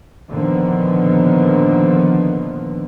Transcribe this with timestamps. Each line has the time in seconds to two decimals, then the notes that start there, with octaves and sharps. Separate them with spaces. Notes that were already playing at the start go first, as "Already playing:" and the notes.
0.29 A#2 D3 D#3 F3 B3